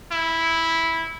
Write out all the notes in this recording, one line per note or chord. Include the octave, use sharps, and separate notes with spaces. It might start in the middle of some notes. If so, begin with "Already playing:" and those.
E4